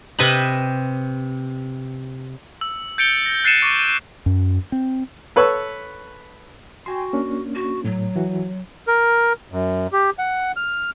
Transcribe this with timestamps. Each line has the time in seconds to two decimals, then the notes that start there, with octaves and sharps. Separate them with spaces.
0.19 C3 B4 C5 D#5 B5
2.61 E6
2.98 G6 A6 C#7 D7 F7 G7
3.26 A#6
3.44 F#6 A6 C7 C#7 D#7 E7
3.62 C#6 D6
4.26 F#2
4.72 C4
5.36 A4 B4 C#5 C#6 E6
6.86 F#4 G5 G#5 C6
7.13 A#3 C#4 D4
7.55 F#4
7.85 A2 F#3
8.16 E3 F#4
8.88 A#4
9.52 F#2
9.93 G4
10.19 F#5
10.56 F6